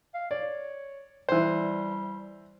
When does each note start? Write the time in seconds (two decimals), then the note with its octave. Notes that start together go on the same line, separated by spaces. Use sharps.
0.14 F5
0.31 C#5 D5
1.29 E3 G3 C5